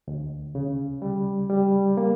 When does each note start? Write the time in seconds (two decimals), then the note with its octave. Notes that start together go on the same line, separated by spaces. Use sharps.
0.08 D2
0.55 C#3
1.02 G3
1.50 G3
1.97 A#3